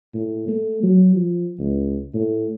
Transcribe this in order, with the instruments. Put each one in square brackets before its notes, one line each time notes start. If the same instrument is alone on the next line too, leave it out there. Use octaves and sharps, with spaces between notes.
[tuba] A2
A3
F#3
F3
C#2
A2